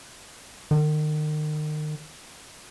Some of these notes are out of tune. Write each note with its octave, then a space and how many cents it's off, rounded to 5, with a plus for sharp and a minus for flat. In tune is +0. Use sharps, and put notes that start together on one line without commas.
D#3 -35